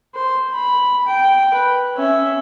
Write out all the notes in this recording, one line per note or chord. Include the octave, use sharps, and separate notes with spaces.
C5
B5
G5
B4
C#4 E5